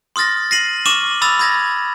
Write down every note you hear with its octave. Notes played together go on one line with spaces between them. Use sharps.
C6 D#6 F6 A6 A#6
A#6 C7 D#7 F#7
C#6 D6 F6 D#7 E7 F#7
B5 D#6 E6 A6 F7
B5 D#6 G#6 A#6